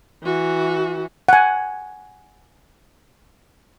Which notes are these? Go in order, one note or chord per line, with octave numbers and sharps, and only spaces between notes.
E3 F#4
F#5 G#5